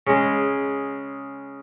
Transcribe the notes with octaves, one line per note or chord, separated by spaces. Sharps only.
C#3 G#3